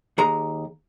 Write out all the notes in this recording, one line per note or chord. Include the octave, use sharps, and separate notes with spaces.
D#2 G#4 A#5